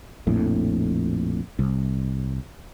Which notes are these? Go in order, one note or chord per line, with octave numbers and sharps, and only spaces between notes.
A#1 F2 A2
C2